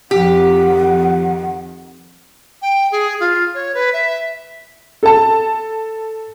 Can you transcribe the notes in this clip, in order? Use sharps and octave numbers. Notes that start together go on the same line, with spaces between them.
F2 D#3 G4 F#5
G5
G#4
F4
C#5
B4
E5
A4 A5